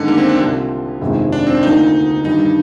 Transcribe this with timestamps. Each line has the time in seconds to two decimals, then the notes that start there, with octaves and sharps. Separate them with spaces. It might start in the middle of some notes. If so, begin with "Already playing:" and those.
Already playing: G2 D3 D#3 G#3 D#4
0.08 A#3
0.18 C4
0.28 D4
0.39 C2 C3 F3 C4
1.01 G1 F2 C3 D#3 G#3
1.32 D4
1.47 C4
1.63 D2 D3 F3 A#3 D#4
2.24 G2 D#3 G3 D4 D#4